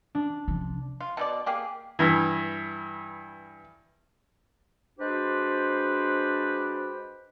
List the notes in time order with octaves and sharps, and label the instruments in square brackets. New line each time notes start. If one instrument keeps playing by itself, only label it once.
[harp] D4
[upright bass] C3 F3
[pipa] F4
B2 E4 D5
A#3 G4 G#4
[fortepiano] G2 E3
[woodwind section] G#3 D4 F#4 G4 B4 C5